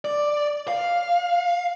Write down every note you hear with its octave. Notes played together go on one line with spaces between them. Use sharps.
D5
F5